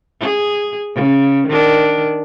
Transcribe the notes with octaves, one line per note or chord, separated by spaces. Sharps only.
G#4
C#3
D#3 D4